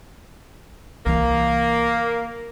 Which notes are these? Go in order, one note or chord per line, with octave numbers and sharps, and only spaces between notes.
C2 E3 A#3